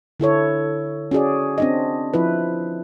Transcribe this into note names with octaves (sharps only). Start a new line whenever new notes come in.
D3 E4 A4 C#5
C#4 F#4 G#4 D5
C4 D4 D#5
F3 E4 B4